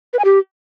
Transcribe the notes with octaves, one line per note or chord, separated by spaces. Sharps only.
B4
G#5
G4